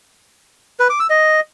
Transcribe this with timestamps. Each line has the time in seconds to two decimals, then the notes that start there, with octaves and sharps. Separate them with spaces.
0.80 B4
0.90 D6
1.00 E6
1.10 D#5